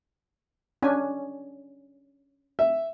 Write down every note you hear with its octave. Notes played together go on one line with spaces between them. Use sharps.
C#4 D4 G#5
E5